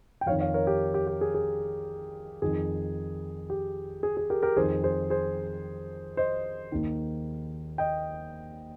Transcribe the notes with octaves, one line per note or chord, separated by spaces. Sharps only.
G5
F2 D#3 C#5 F5
C#5 F5
A#4 C#5
G4
G4
G4
G#4
G#4
F2 D#3 G#4
G4
G#4
G#4
G4 A#4
G4 A#4
F2 D#3 G#4 C5
G#4 C5
G#4 C5
C5 D#5
D#2 D#3
D#5 G5